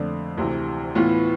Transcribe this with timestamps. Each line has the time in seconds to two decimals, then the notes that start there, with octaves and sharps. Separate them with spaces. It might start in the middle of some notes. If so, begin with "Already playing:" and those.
Already playing: F2 D3 A3 D4
0.38 D2 C3 E3
0.95 A2 E3 B3 F4 B4